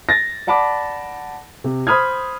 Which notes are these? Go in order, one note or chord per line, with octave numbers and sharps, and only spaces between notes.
A6 A#6
D5 F#5 A5 B5 D6
C3
C5 B5 D#6 F6 G#6